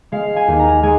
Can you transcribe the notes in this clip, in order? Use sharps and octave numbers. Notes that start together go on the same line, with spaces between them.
G#3 F5
G#5
D#2
A#5
G#3 G#5